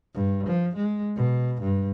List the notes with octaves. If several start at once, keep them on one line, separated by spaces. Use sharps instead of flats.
G2
F3
G#3
B2
G2